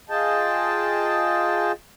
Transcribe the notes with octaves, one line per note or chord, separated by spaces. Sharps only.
F4 G#4 D#5 G5 A5